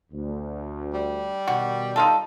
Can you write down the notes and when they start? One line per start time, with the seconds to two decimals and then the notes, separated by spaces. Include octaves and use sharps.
0.11 D2
0.93 G3
1.48 B2 D#3 F#4
1.96 D#4 F4 A4